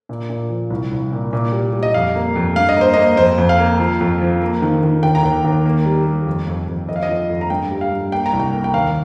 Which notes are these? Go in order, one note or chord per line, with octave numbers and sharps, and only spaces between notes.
A#2
A#2
F3
C2
C2
A#2
A#2
G3
G3
D#5
F2 F5
A#3
F2
G2 F5
D#5
A#3 C5
D#5
A#3
F2 C5
F2
F5
A#3
F3
F2
F3
A#3
D#3
D#3
D#2 G5
A#5
D#2 G5
D#2
A#3
G3
G3
F2
F2
F2
F2 D#5
F5
D#5
F3
F2
A#5
G2 G5
G3
F5
G2
A#3 G5
A#5
C2
G5
A#3
G5
D#2 F5